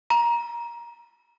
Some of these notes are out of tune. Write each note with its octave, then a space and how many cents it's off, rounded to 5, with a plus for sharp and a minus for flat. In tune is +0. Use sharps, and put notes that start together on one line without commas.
A#5 +20